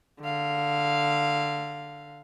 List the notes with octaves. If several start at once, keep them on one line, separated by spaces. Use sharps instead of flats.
D3 F5